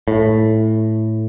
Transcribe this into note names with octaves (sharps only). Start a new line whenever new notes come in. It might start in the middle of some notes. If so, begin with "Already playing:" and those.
A2